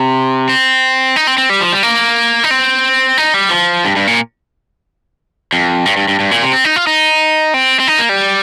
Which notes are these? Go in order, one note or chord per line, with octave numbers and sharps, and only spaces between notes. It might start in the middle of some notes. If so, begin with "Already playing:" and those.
Already playing: C3
C4
D#4
C4
C4
G3
F3
G3
A#3
D#4
C4
D#4
G3
F3
G2
G2
A#2
F2
G2
G2
G2
G2
A#2
C3
C4
D#4
F4
D#4
C4
C4
D#4
A#3
G3